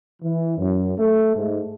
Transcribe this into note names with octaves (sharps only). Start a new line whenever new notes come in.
E3
F#2
A3
G#2